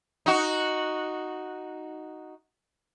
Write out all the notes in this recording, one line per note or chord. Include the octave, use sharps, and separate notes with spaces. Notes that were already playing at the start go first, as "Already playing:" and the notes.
D#4 F#4